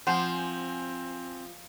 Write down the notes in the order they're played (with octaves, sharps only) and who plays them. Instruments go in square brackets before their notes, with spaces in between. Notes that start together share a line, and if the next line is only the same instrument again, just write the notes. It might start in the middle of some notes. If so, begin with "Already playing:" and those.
[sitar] F3 [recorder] C4 [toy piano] F#5 C6 [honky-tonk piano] G#5 G6 E7